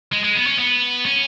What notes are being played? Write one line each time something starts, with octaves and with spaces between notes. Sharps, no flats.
G#3
G#3
B3
C#4
B3
C#4